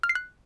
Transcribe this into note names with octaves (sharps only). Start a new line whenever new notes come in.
F6
C7
F#6